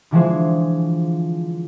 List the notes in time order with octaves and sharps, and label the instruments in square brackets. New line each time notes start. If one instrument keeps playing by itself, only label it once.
[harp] D3 E3 F3 G#3 G#4 C5